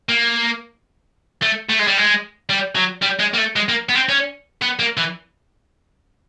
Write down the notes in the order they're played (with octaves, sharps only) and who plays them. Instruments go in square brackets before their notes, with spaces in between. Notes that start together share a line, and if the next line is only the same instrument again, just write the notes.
[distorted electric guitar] A#3
A3
A3
G#3
G3
G#3
G3
F#3
G3
G#3
A#3
A3
G#3
A#3
B3
C4
C#4
B3
A#3
E3